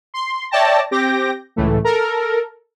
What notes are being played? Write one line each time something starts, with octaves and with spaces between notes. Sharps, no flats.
C6
C#5 D5 E5 G5 A5 A#6
C4 G4 D6 G6 A#6
C#2 A2 E3 A3
A4 A#4